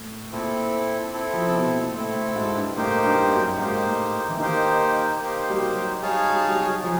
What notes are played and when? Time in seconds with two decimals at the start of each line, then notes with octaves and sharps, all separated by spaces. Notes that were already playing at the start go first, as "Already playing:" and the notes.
Already playing: A2
0.32 A#2 C4 E4 A4
1.13 C4 E4 A4
1.33 F3
1.46 C3
1.54 B2
1.74 A#2
1.94 A2 C4 E4 A4
2.15 A2
2.35 G#2
2.55 G2
2.76 A2 A#3 D#4 G4 C5
3.03 G2
3.31 F#2
3.58 G#2 A#3 D#4 G4 C5
3.85 A2
4.29 E3
4.40 D#3 A#3 D#4 G4 C5
5.21 A#3 D#4 G4 C5
5.50 G3
5.62 F#3
6.02 G3 D#4 G#4 C#5 F5 A5
6.29 G3
6.48 G3
6.56 F#3
6.83 F3 D#4 G#4